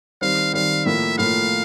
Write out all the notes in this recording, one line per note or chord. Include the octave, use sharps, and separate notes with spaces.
D#3 G3 C4 F5
D#3 G3 C4 F5
A2 F3 A#3 E5
A2 F3 A#3 F5